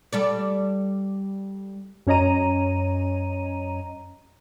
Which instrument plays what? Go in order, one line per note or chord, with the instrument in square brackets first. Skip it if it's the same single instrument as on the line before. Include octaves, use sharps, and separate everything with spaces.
[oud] G3 A4 D5
[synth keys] F#2 C#4 C#5 D#5 A#5 D#7